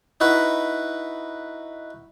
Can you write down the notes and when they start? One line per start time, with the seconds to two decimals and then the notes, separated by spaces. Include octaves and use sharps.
0.20 D#4 E4 F#4 B4